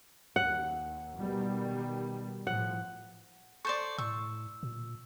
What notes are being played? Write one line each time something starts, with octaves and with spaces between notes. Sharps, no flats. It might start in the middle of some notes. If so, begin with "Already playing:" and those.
D#2 F#5
B2 D#3 G3
A2 F3 F#5
A4 C5 D5 C#6 G6
A2 C#6 E6
A#2